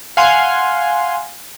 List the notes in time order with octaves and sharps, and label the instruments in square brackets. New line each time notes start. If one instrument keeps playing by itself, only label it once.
[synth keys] F5 F#5 G#5 C6